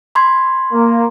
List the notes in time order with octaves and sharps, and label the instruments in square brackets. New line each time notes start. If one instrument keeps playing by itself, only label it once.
[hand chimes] B5 C6 G#6
[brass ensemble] A#3